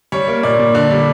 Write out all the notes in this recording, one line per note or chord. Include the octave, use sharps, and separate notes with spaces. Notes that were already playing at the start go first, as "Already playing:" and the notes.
G3 C#5
A#3
A#2 D5
A#2
D3 D5
G3